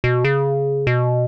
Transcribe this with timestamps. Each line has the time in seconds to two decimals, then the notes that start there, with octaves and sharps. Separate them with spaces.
0.04 B2
0.25 C#3
0.87 B2